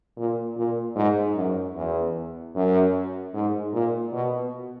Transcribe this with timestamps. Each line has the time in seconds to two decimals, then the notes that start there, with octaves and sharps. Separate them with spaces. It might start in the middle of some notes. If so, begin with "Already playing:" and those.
0.17 A#2
0.57 A#2
0.96 G#2
1.36 F#2
1.75 E2
2.55 F#2
3.34 G#2
3.73 A#2
4.13 B2